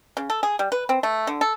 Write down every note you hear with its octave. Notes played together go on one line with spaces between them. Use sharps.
C#3
A4
G#4
G3
B4
C4
A3
D3
A4